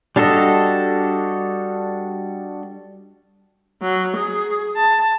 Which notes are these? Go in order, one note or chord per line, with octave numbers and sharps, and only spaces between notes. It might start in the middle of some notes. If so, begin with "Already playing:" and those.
G3 D4 F#4 A4 D#5
F#3
G#4
A5